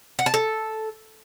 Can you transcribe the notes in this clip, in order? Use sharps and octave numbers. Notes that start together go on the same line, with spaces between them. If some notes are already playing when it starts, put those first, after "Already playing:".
F#5
A5
A4